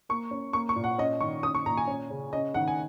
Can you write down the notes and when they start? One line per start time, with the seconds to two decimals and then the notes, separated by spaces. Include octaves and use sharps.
0.09 A#3 C#6
0.31 C#4
0.53 A#3 C#6
0.69 C#6
0.76 A#2
0.84 F#5
0.98 C#4 D#5
1.20 D#3 C#6
1.43 C#4 D#6
1.55 C#6
1.66 A#2 A#5
1.77 G#5
1.87 C#4
2.10 C#3
2.33 C#4 D#5
2.54 D#3 F#5
2.68 G#5